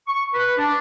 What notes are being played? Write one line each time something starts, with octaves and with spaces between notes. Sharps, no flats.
C#6
B4
D4